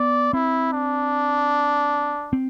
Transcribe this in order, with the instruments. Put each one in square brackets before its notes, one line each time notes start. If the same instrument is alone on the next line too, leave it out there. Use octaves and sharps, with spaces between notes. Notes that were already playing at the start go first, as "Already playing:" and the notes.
Already playing: [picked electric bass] B3 [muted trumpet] D5
[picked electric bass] C4 [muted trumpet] E4
[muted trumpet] D4
[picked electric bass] C4